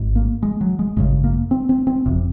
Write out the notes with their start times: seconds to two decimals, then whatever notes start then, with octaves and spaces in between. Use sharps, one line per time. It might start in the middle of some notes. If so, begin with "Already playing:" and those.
Already playing: G#1 G#2
0.16 A#3
0.43 G#3
0.61 F#3
0.79 G#3
0.97 G#1 F#2 C#3 G#3
1.24 A#3
1.51 C4
1.69 C4
1.87 C4
2.06 F#1 F2 C3